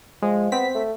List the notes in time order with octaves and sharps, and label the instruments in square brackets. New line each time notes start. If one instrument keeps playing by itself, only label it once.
[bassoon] F3 [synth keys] G#3
[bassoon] B3 [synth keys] C4 B6
[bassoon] A3